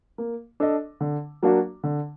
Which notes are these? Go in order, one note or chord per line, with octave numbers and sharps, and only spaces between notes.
A#3
D4 A4 D#5
D3
F#3 A#3 D4 F#4
D3